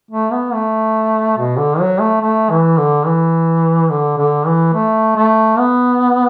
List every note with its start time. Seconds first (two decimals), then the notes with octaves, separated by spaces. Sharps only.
0.11 A3
0.32 B3
0.54 A3
1.38 B2
1.58 D3
1.80 F#3
2.00 A3
2.21 A3
2.50 E3
2.78 D3
3.06 E3
3.90 D3
4.18 D3
4.46 E3
4.74 A3
5.16 A3
5.58 B3